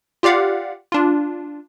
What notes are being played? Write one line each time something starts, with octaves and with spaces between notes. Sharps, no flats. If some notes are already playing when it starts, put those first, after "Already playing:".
F4 G4 D5 F5 F#5
D4 F4